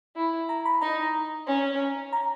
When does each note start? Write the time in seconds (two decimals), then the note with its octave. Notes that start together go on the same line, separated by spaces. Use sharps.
0.16 E4
0.49 A#5
0.66 B5
0.81 D#4 A#5
1.47 C#4
2.13 A#5